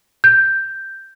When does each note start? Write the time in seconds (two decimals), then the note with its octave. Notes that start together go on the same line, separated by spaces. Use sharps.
0.24 G6